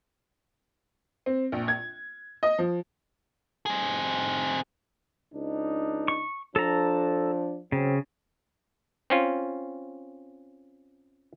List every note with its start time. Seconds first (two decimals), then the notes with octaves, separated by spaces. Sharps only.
1.26 C4
1.52 A#1
1.68 G#6
2.43 D#5
2.59 F3
3.66 C4 G#4
5.34 C#2 D4 D#4
6.08 C#6
6.56 F3 D4 A4 A#5
7.72 C#3 F#3 C4
9.10 C4 C#4 F4